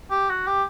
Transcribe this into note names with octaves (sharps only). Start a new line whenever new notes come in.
G4
F#4
G4